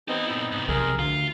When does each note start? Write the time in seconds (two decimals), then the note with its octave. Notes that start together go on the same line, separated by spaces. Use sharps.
0.08 B3 C4 D#4 G4 D#5
0.27 A#2 E4
0.52 G#2 C3
0.68 B1 F2 C3 G#4 A#4
0.99 D2 D3 F4